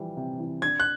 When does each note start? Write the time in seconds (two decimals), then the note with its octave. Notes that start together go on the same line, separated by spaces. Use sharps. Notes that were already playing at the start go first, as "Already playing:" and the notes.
Already playing: E3 F3 G3
0.17 C3
0.40 E3
0.62 D4 G#6
0.80 F#6